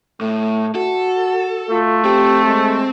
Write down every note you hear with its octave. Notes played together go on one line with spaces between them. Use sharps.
A2 A3
F#4 A4
A3 F4
C4 G4
G#3